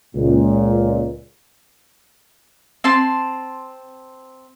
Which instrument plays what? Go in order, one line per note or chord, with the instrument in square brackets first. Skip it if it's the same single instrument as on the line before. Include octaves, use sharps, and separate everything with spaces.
[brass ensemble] C#2 A#2
[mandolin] C4 A5 C6